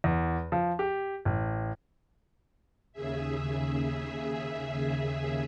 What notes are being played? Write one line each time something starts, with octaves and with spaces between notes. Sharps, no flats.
E2
F3
G4
A1
D#2 C#3 G#4 E5